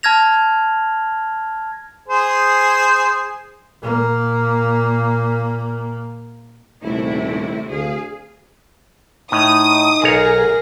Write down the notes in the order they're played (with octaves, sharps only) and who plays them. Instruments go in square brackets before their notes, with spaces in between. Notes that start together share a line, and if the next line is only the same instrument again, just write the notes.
[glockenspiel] A5 F6 G#6 A#6 F7
[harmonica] G#4 C5
[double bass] A#2 A#3
[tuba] D#1 [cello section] C3 A3 E4
[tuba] D2 [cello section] G#4 F5
[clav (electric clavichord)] A2 [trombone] D#4 [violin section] D#6
[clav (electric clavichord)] B1 C#5 A#5 [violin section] G#4 [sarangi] A#4